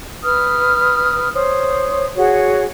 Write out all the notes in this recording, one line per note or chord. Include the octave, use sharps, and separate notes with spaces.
B4 D#6 F6
C5 C#5 D#6
F#4 G#4 C#5 F#5